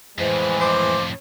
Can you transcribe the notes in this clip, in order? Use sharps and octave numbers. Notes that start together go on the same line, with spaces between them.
F2 A2 E3 G#3 C5
C5 D6